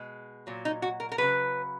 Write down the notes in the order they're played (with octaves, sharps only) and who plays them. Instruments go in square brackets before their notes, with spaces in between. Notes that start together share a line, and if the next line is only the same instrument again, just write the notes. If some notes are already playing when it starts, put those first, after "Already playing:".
Already playing: [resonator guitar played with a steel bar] B2 G#3
A#2 F#3
D#4
F#4
A#4
A#4
C#3 F#3 B4